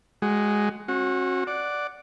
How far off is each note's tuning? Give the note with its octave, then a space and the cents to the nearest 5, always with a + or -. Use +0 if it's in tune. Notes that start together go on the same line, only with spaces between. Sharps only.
G#3 +0 F#4 +20
C#4 -45 F#4 -15
D5 +0 F#5 +0